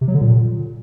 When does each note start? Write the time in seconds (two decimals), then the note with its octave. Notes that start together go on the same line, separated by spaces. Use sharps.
0.01 C3
0.08 F#3
0.14 D3
0.21 A#2